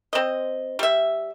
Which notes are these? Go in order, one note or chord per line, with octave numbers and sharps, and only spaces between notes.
C4 D#5
G3 E5